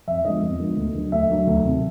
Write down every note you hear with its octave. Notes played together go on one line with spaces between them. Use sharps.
F2 E5
D3 F3 G#3 B3 D#5
F2
D3 F3 G#3 B3
D2
D3 F#3
D2 E5
D3 F#3
D2
C3 D#3 F#3